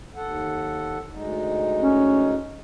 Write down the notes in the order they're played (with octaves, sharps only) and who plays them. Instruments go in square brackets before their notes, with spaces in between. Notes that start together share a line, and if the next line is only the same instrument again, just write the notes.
[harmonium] D#2 A4 F#5
D2 G#3 D#4
[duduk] C#4